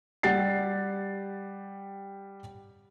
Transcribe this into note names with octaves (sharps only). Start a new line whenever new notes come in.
G3 G4 F#5 A6 C7